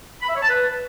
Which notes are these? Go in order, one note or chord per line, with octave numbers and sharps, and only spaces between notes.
B5
E5
C#5
A5
B4